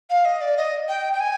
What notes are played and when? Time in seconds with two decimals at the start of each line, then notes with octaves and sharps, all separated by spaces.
0.10 F5
0.25 D#5
0.41 D5
0.57 D#5
0.88 G5
1.13 G5
1.20 G#5